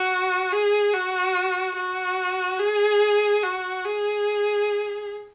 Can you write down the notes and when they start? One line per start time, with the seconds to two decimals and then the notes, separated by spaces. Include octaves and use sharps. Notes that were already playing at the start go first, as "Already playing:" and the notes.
Already playing: F#4
0.52 G#4
0.93 F#4
1.76 F#4
2.60 G#4
3.43 F#4
3.85 G#4